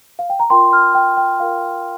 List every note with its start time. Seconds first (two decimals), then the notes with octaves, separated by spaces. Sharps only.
0.19 F5
0.30 G5
0.40 A#5
0.50 F4 A#4 G5 C6
0.72 C6 F6
0.95 G5
1.17 G5
1.40 F4 A#4 F5